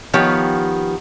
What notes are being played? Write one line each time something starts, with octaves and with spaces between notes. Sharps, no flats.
D#3 F3 B3 G4 C#5